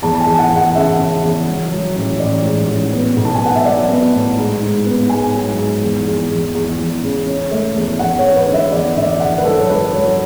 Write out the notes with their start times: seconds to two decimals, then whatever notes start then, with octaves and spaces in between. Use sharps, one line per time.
0.02 E2 A5
0.15 A5
0.21 G#5
0.26 E2
0.39 F#5
0.51 E2 F#5
0.75 C#3 E5
0.99 C#3
1.23 E2
1.48 F#3
1.71 F#3
1.95 A1
2.20 A1 D5
2.44 G#2
2.69 A1
2.93 B3
3.16 B1
3.25 A5
3.35 G#5
3.41 B3 F#5
3.55 E5
3.65 F#3 D5
3.89 B3
4.13 A2
4.37 G#2
4.62 G#2
4.86 B3
5.09 G#2 G#5
5.34 F#3
5.57 G#2
5.83 E2
6.07 E2
6.30 E2
6.55 E2
6.79 E2
7.03 C#3
7.27 C#4
7.51 A3
7.76 E2
7.99 E2 F#5
8.18 C#5
8.24 C#4
8.36 B4
8.48 D3
8.54 E5
8.72 E2 D5
8.96 D3 E5
9.04 D5
9.11 E5
9.20 F#1 F#5
9.38 B4
9.44 F#3 A4
9.59 C#5
9.69 F#3 B4
9.93 F#3 C#5